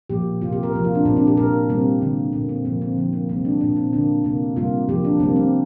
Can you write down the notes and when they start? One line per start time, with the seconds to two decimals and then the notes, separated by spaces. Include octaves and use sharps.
0.10 A#2 F3 A#3 G4
0.41 C3 A#3 F4
0.52 G4
0.63 A#4
0.73 C3 F3 A#3
0.84 F4
0.95 D4
1.05 A#2 A#3 C4
1.17 D4
1.27 G4
1.37 A#2 A#3 A#4
1.69 C3 G3 A#3 C4
2.01 D3 G3 A#3
2.33 A#2 A#3
2.49 C4
2.65 A#2 F3 A#3
2.82 C4
2.97 D3 F3 A#3
3.13 A#3
3.29 C3 G3 A#3 C4
3.45 D4
3.61 A#2 A#3 D4
3.76 C4
3.93 D3 A#3 D4
4.24 C3 A#3
4.56 C3 G3 A#3 F4
4.89 C3 F3 A#3 G4
5.05 D4
5.20 C3 G3 A#3 C4
5.36 C4